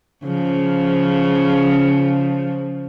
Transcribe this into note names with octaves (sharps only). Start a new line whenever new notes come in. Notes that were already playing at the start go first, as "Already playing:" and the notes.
C#3 F3